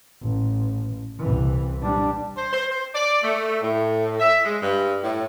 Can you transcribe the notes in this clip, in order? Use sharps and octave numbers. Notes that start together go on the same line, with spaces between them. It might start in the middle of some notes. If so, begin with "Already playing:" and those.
A1
C2 E3
G3 D4
C5
C5
C5
D5
A3
A2
E5
G#3
G2
A2